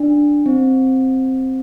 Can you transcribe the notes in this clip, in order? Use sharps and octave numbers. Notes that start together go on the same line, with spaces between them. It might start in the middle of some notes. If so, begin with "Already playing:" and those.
Already playing: D4
C4